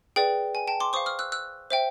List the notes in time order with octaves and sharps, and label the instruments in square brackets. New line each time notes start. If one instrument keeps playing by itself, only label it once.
[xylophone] G#4 B4 D5 G5
G#5
G5 A5
C6 D6
C5 C#6 D#6
F5
D#6 F6
E6 F#6
E6 F#6
C5 E5 G5